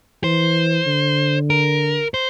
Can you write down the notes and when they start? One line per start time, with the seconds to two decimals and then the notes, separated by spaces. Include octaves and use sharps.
0.23 E3 C5
0.87 D3
1.50 A#4
2.14 C5